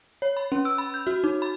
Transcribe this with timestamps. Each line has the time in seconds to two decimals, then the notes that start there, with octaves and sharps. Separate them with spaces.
0.22 C#5
0.37 B5
0.52 C#4
0.65 E6
0.78 B5
0.94 G6
1.07 F#4
1.24 D#4
1.42 B5